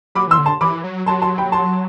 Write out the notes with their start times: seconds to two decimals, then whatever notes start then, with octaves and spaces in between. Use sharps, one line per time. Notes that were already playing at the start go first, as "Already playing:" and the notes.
0.15 F#3 B5 D6
0.27 E3 C6 E6
0.38 D3
0.46 A5 C6
0.61 E3 B5 D6
0.84 F#3
1.06 F#3 A5 C6
1.22 A5 C6
1.38 G5 B5
1.52 A5 C6